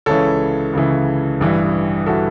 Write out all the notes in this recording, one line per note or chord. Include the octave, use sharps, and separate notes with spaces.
C#2 C#3 E3 A4 C#5
C#2 C#3 E3
A1 G2 E3
E3 F#4 A4